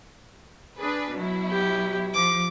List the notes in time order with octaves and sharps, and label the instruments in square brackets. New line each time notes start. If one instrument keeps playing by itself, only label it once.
[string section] D4 G#4 B4
B2 F#3 E4
[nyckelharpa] G4
[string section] F3 [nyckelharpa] D6